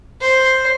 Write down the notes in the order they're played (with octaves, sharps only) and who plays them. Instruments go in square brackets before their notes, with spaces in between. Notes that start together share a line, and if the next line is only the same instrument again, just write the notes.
[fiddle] C5